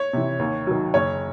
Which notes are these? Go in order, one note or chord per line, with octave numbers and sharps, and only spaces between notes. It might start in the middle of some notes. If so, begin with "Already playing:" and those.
Already playing: C#5
C3 E3
D#2
D#3 F#3
F#1 C#5